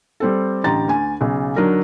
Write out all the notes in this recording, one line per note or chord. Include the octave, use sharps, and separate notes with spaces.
G3 C4 A4
A1 D3 G4 A#5 A6
D2 G#5
B1 C#3
D3 F#3 D4 D#4 A#4